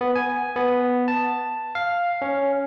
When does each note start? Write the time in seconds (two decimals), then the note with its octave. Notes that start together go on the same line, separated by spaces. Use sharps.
0.01 B3
0.15 G#5
0.56 B3
1.08 A5
1.75 F5
2.22 C#4